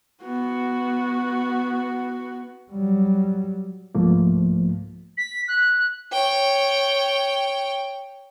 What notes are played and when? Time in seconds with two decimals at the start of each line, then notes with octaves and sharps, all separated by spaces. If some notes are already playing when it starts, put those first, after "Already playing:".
0.23 B3 F#4
2.72 F#3 G3
3.95 C2 G#2 F3 A3 A#3
5.17 B6
5.48 F#6
6.12 C#5 G5